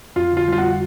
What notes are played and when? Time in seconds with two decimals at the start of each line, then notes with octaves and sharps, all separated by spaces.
0.16 F2 F4
0.32 D3 F4
0.48 G3 F4
0.58 F#4